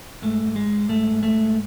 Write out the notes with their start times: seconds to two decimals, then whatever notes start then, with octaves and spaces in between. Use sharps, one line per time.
0.22 G#2 A3
0.45 G#2
0.56 G#3
0.66 G#2
0.89 G#2 A3
1.11 G#2
1.23 A3
1.34 G#2